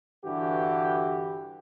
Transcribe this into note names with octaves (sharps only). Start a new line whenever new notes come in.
G2 D3 E3 F#4 G4